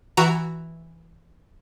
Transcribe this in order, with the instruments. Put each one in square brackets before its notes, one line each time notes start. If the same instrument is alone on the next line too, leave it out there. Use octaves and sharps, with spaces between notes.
[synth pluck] E3 F#4 A#5